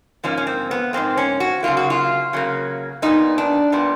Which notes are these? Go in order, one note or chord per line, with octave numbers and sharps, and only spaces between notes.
G#2 F3 A#3 C#4
C#4
C4
B3
G#2 F3 A#3 C4
C#4
F#4
C#3 F#3 A#3 F4
F#4
F4
C#3 F#3 A#3
A#2 G3 B3 D#4
D4
A#2 G3 B3